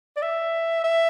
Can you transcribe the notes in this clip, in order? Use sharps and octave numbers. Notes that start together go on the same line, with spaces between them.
D5
E5
E5